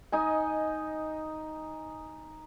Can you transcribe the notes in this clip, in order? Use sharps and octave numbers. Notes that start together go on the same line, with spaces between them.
D#4 D#5 G#5